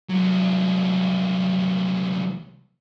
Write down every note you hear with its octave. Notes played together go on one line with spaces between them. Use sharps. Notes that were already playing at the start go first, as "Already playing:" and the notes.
C2 F#3